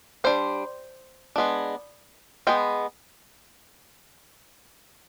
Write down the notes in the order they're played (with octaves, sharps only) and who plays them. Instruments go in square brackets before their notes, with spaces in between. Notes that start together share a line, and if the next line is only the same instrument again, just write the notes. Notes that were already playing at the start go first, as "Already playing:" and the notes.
[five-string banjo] G3 D4 C5
G#3 B3 D4
G#3 B3 G5